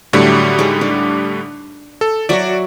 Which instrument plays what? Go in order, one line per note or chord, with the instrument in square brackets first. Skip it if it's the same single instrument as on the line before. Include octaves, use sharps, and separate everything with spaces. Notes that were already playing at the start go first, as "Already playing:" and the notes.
[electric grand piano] A2 D3 G3 [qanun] F#3 A3 G4
[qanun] G#3 D#4
D4
[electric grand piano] A4
[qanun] F#3 E5 [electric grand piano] F#4 D5